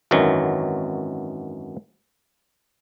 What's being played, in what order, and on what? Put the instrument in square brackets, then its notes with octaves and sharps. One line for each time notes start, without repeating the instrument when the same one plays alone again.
[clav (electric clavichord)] G#1 F#2 D#3 E3 F#3